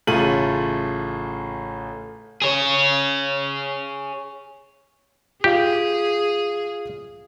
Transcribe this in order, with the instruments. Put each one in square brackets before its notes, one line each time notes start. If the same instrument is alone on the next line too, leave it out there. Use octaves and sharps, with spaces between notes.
[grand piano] A1 C#3 A3 F4 D#7 F#7
[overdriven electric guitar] G#4 C#5
[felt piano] F4 F5 [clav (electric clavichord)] G4 [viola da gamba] G#4